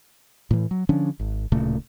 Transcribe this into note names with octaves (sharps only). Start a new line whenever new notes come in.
A2 E3
F#3
D3 F3 C#4 D4
G#1
D1 A#2 C#3 A3